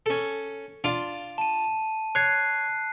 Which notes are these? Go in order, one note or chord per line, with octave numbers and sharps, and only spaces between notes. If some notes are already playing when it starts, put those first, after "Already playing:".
C#4 A4
D4 F4 F5
A5 D#7
C#5 F#6 C7